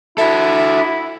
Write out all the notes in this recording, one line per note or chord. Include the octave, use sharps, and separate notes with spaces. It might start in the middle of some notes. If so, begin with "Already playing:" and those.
E4 F#4 A4 E5